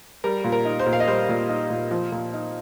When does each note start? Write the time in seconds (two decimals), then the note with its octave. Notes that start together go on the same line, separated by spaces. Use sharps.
0.24 G3 A#4
0.44 A#2
0.52 A#4
0.65 D#4
0.79 C5
0.86 A#2
0.93 F5
1.00 D#5
1.08 G3 C5
1.29 A#2
1.49 D#4
1.70 A#2
1.91 F3
2.12 A#2
2.34 D#4